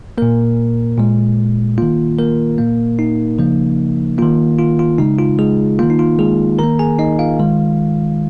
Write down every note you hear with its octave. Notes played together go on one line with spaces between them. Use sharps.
A#2 A#3 A#4
A#2 G#3
D#3 A#3 F4
A#3 A#4
A#2 A#3
D#4
C#3 F3 A#3
D#3 A#3 F4
F4
F4
C#3 G#3 D#4
F4
G#3 G#4
D#3 A#3 F4
D#4
F4
G#3 G#4
D#3 A#3 A#4 A#5
G#4 G#5
D#4 D#5
F4 F5
D#3 G#3